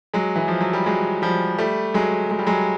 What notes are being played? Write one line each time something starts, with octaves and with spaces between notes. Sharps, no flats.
F#3 G#3
E3
F3
F#3
G3
F#3 G#3
F3 G3
G3 A3
F#3 G#3
G#3
G3
F#3 G#3